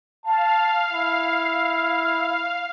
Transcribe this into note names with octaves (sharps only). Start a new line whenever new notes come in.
F5 A5
E4